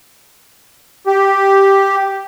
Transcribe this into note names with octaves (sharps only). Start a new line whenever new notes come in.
G4